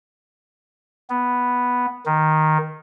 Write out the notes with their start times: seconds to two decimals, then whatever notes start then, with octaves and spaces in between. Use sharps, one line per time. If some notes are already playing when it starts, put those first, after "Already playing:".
1.10 B3
2.06 D#3